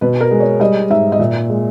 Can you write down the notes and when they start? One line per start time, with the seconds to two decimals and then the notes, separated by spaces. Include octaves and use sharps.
0.01 B2 B4
0.21 A#4
0.31 G#3
0.40 C#5
0.60 G3 D#5
0.90 G#2 E5
1.12 D#5
1.19 A#2 E5
1.50 G#3